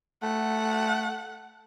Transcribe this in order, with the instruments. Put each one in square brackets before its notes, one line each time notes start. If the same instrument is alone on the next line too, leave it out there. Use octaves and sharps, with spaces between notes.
[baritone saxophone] A3 [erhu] F#5